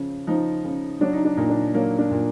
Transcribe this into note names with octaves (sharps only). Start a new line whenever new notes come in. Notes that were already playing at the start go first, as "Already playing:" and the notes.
Already playing: C#3 F3
F3 D#4
C#3
F#3 D4
D#4
D4
A#2 D#4
D4
F#3 A#3
D4
A#2